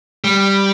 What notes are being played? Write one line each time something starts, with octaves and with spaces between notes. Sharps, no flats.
G3